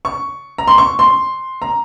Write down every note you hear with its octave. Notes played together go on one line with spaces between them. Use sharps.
C#6
A#5
C6
C#6
C6
A#5